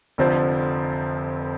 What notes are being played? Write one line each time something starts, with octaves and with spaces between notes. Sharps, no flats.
F1 F2 D3 F3 C4